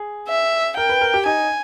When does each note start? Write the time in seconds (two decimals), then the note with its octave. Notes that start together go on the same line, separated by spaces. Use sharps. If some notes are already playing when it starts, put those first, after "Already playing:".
Already playing: G#4
0.28 E5
0.77 A#4 G5
0.89 B4
1.01 A#4
1.14 G4
1.26 D#4 G#5